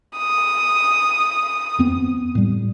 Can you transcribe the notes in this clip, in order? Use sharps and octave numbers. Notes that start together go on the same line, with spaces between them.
D#6
F2 B3 C4
A2 G3